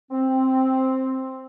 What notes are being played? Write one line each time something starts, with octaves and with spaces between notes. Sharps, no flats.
C4